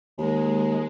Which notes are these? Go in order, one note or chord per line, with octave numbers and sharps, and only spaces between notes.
D#2 G#3